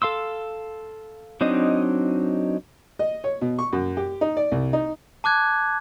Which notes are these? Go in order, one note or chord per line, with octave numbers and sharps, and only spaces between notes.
A4 F5 C6 E6
F#3 C4 D4 D#4 D#5
D#5
C#5
B2
C#6
F#2
G4
D#4
D5
C2
D#4
A5 D6 F#6 G#6